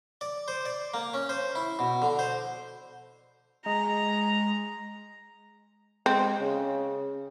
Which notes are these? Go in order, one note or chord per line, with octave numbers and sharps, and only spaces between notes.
D5
C5
D5
A#3
C#4
C5
E4
B2
D3
C5
G#3 A#5
G#3 C4
C#3